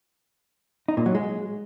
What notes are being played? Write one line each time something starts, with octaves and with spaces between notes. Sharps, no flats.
D#4
A#2
F#3
G#3